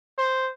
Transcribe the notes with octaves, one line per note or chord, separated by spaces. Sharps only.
C5